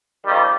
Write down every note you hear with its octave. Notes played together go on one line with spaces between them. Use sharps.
F2 D#3 G3